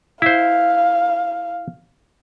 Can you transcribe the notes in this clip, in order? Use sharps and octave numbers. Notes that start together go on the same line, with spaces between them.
E4 C5 F5